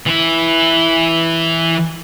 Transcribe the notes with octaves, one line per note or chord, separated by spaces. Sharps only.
E3 E4